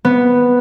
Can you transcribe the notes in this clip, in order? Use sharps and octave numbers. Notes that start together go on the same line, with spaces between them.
B3